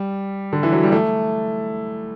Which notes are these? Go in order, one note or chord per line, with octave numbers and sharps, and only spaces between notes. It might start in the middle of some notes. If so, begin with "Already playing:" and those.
Already playing: G3
D3
E3
F#3
G3
A3